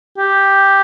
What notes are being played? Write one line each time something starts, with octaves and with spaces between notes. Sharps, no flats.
G4